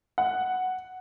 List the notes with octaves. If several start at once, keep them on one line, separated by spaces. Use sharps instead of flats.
F#5